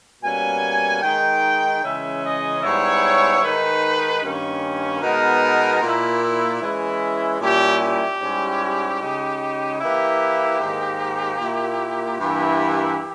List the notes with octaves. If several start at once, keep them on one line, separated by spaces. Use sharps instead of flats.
B2 G3 A#3 C#4 G#5
D#3 G#3 D#4 G5
C#3 E3 G#3 C#4 E5
D#5
G#2 G3 B3 E4 C#5
D#3 G#3 D#4 B4
G2 D#3 A#3 C#4
B2 G#3 B3 D#4 A#4
A#2 A#3 E4
E4
E3 G#3 C#4 E4
A#2 G3 C#4 E4 G4
G4
G#2 G3 C#4 E4
C#3 G#3 D#4
E3 A#3 E4 G4
G#2 D#3 A#3 D#4
A#2 A#3 E4
G2 E3 A#3 E4